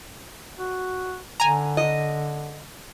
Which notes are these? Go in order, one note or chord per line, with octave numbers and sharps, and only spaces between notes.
F#4
D3 G#5 A#5
D#5